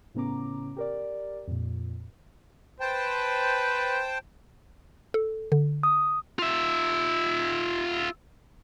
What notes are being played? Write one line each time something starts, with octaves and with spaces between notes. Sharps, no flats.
A2 C#3 B3 C#4 A#5 D6
G4 A#4 D5
F2 A#2
B4 C5 G5 A5
A4
D3
D#6
F4 E5